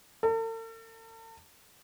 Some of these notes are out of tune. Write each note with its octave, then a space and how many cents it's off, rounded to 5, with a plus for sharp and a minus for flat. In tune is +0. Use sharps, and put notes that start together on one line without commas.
A4 +45